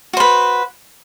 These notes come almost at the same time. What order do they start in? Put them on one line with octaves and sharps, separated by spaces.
F#4 C5 B4